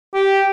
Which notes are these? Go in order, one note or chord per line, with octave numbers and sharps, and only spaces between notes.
G4